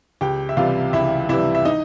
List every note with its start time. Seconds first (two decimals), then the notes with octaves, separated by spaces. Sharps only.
0.21 C#2 G4 G5
0.49 E5
0.57 C3 E3 G3 F4 F5
0.93 C#2 E4 E5
1.29 C3 E3 G3 E4 E5
1.55 E5
1.65 D#4 D#5